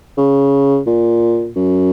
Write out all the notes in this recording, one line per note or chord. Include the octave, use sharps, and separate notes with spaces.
C#3
A#2
F#2